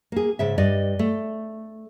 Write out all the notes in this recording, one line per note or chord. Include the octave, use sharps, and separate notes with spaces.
A#3 G#4
G#2 C#3 E5
G2 D5 D#5
A3